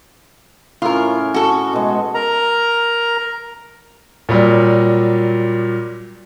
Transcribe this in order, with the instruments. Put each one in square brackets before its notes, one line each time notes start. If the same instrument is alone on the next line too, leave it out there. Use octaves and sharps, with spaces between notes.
[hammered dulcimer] A2 C#4 [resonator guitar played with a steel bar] F4 A#4
[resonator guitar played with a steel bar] F#4 A4
[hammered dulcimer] B2 G#3
[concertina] A#4 A#5
[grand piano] A#2 F#3 G3